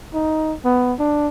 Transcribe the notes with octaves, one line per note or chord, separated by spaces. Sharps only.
D#4
B3
D4